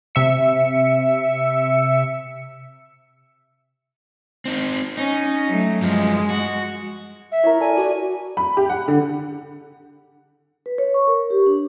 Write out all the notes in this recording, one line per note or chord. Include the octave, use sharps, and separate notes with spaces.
C3 E5 C#7
C4 D#4
C#4 D#4
F#3 A3
G2 F3 G#3
F#4
E5
E4 A#4 C#5
A4 D5 G#5
F#4 D5
B5
G4
F#5
D3
B4
C#5
C#6
A#4
G4
D4